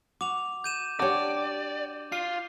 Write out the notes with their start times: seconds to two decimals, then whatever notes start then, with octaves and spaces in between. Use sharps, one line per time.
0.21 F#4 D6 F7
0.64 G6 D#7 E7
0.99 D4 F#4 G4 C#5 D5
2.12 F4 C7